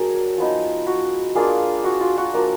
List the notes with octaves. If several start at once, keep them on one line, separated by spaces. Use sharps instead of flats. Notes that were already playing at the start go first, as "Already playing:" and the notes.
Already playing: F#3 D4 G#4 A#4
F3 B3 D#4
F#4
A#3 D4 F4 G#4
F#4
F4
F#4
F3 A#3 D4 A#4